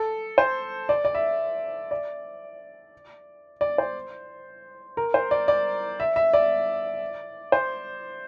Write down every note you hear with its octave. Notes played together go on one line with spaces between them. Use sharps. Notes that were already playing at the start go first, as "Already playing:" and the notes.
Already playing: A4
C5
D5
D5
E5
D5
D5
C5
A#4
C5
D5
D5
E5
E5
D5
C5